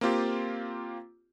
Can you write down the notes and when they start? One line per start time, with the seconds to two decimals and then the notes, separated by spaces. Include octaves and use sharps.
0.01 A#3 C4 F4 G4